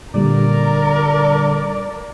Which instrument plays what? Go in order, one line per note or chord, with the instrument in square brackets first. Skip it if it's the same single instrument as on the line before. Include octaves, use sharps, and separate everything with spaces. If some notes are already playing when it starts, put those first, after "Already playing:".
[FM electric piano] A#2 G3 [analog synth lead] D3 [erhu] A#4 [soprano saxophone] D5